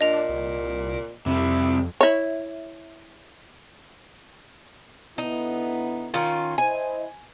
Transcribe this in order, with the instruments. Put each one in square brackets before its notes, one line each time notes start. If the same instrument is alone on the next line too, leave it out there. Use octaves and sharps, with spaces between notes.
[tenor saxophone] A#2 [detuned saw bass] D4 [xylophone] D#5 F7
[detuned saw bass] C2
[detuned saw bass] F2 [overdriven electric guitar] C3 G3 [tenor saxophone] E4
[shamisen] E4 C#5
[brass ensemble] D3 B3 E4 [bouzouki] D#4
[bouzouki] D#3 C#4 F4
[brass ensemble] E4 C5 D#5 [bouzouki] G#5